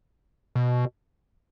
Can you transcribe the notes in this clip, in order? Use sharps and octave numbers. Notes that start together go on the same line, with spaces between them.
B2